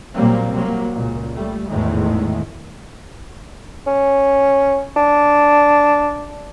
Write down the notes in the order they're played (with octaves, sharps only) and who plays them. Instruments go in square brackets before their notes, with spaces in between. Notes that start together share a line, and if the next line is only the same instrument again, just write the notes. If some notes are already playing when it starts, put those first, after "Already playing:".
[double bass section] A#2 F#3 G3 A#3 C4
C3 F#3 A#3
C#2 A#2
G3 A3
G#1 E2 A2 D#3 G#3 A3
[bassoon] C#4
D4